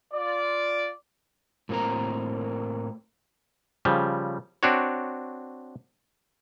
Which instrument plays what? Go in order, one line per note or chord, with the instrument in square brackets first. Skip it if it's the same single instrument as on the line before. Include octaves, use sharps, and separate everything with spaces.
[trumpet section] F4 D5
[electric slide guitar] A2 A#3 C4 A#4 A#5
[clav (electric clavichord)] C#3 F3 G3
C4 D4 F#4 C#5